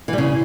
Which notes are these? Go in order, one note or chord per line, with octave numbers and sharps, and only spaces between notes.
E3
G3
C#3